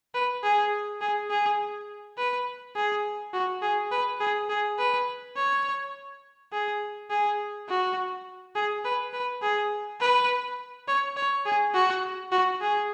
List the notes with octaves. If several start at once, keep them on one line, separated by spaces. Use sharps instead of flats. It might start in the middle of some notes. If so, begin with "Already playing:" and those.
B4
G#4
G#4
G#4
B4
G#4
F#4
G#4
B4
G#4
G#4
B4
C#5
G#4
G#4
F#4
G#4
B4
B4
G#4
B4
C#5
C#5
G#4
F#4
F#4
G#4